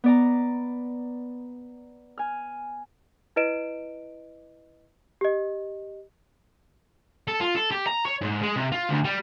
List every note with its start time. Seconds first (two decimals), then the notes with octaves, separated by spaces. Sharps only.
0.04 B3 D5 A#5
2.18 G#5 F6
3.36 E4 B4 D#5 D7 E7
5.21 G4 D#5
7.28 A4
7.40 F4
7.55 A4
7.71 G4
7.87 A#5
8.05 C#5
8.22 G#2
8.42 G#3
8.56 C3
8.72 F4
8.90 D2
9.05 G3